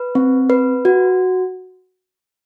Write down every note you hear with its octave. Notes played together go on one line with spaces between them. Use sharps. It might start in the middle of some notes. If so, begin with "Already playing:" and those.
Already playing: B4
C4
B4
F#4